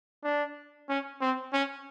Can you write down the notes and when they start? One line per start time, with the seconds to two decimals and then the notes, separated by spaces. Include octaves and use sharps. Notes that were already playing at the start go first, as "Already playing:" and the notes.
0.24 D4
0.89 C#4
1.21 C4
1.53 C#4